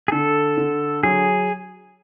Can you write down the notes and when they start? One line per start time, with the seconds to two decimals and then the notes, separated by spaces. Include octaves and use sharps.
0.08 G#4
0.12 D3 A4
0.57 D3
1.03 F#3 G#4